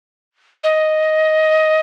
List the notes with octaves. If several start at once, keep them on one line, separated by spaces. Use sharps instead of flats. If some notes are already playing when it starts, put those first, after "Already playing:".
D#5